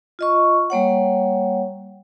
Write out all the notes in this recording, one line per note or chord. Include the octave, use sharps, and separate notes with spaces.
F4 D#5 C#6
G3 A#3 C#5 F#5